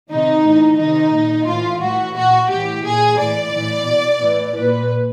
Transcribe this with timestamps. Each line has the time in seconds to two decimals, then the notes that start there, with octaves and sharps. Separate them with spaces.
0.10 C3 D#3 D#4
0.44 A2 E3
0.78 C3 D#3 D#4
1.13 A#2
1.47 A2 E3 F4
1.82 A2 E3 F#4
2.15 A#2 F#4
2.50 A2 E3 G4
2.84 A#2 G#4
3.18 A2 E3 D5
3.53 A2 E3
3.87 B2
4.21 A2 E3
4.55 A#2 B4